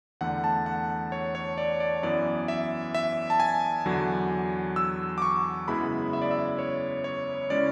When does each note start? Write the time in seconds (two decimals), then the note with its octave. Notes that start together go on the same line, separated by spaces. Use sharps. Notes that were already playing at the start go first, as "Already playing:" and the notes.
0.21 E2 D3 A3 F#5
0.44 A5
0.66 F#5
1.12 C#5
1.35 C#5
1.58 D5
1.80 D5
2.03 F#2 E3 B3 D5
2.48 E5
2.95 E5
3.30 A5
3.40 G#5
3.86 E2 D3 F#3
4.76 E6
5.18 D6
5.22 C#6
5.68 F#2 C#3 G#3 B3 E4 B5
6.13 E5
6.22 D5
6.31 E5
6.58 C#5
7.04 C#5
7.50 C#3 G#3 C#4 E4 D5